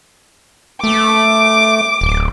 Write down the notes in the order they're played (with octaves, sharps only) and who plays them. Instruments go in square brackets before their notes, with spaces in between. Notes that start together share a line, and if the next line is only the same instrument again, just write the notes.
[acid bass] A3 [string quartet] D6
[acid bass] D1